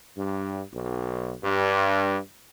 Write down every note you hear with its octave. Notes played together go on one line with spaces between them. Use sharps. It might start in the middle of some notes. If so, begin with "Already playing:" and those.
G2
B1
G2